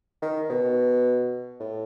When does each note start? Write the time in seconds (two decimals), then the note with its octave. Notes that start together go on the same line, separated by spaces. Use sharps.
0.22 D#3
0.50 B2
1.60 A2